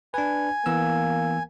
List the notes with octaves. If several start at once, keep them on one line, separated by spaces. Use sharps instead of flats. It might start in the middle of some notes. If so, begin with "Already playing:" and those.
D4 B4 G#5
E3 A#3 B3 E6